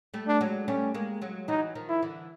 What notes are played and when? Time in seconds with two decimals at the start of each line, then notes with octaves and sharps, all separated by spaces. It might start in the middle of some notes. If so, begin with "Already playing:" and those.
0.14 G3 A3
0.28 D4
0.41 F#3 G#3
0.67 G3 A3 C#4
0.94 G#3 A#3
1.22 F#3 G#3
1.48 E3 F#3 D#4
1.75 D#3 F3
1.89 E4
2.03 D3 E3